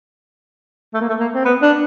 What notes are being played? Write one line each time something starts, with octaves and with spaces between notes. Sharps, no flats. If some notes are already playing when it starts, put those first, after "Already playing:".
A3
A#3
A3
A#3
C4
B3
D4